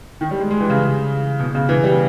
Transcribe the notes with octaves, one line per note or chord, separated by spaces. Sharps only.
D#3
G3
G#3
G#3
E3
C#3
B2
C#3
E3
G3